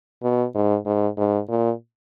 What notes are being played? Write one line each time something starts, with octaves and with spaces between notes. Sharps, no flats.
B2
G#2
G#2
G#2
A#2